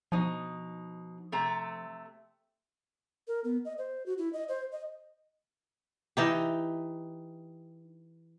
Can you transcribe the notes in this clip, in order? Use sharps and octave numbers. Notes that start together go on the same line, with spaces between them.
B2 F3 D#4
C3 A3 A#5
A#4
B3
D#5
C5
F#4
E4
D#5
C5
D#5
E3 D#4 G4